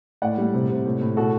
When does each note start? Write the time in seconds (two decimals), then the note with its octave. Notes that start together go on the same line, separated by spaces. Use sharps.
0.22 A2 D5 F#5
0.38 G3
0.54 C3
0.69 C3
0.85 A2
1.01 A2
1.17 B2 F#4 A4